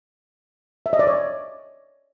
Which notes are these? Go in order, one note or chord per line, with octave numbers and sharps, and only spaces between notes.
E5
D#5
D5
C#5